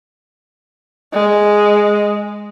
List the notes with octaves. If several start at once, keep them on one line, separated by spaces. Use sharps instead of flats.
G#3